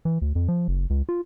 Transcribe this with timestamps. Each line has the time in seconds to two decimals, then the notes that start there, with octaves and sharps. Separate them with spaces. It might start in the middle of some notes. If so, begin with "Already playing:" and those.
0.05 E3
0.22 D2
0.35 F2
0.48 F3
0.68 F#1
0.90 C#2
1.09 F4